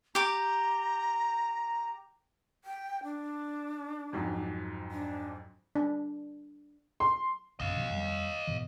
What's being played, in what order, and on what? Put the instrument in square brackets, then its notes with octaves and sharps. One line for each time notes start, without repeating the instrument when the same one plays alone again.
[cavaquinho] G4 D6 [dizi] A#5
[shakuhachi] G5
D4
[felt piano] F2 G#2 F#3
[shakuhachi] D4
[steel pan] D4
[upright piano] C6
[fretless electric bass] A#1 F#2 C#3 [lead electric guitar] D#5 F5
[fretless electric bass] B2 F3 F#3
F2 F3 G3
G#2 B2 E3